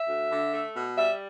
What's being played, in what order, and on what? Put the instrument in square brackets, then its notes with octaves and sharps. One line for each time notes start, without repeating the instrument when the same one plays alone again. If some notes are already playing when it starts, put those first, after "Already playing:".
Already playing: [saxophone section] E5
D2
D3
A3
B2
G3 E5